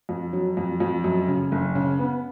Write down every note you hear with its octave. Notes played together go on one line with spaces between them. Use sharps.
F2
F#3
F2
F2
F#2
C#3
F#1
C#3
B3